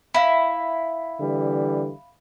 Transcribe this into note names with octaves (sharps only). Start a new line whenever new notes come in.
E4 F5 B5
D3 E3 G3